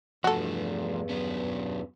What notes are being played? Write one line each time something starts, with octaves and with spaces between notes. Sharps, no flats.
E2 G2 F3 A3 F#4 A4
F#3 B3 C#4